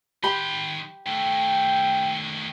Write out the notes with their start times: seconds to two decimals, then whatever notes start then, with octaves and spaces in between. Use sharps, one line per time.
0.23 D#3 G4 B5 C6
1.06 D#3 A3 G5